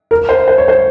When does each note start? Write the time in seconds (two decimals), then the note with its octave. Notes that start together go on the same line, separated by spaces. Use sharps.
0.11 A#4
0.29 C5
0.48 C5
0.58 C#5
0.68 C5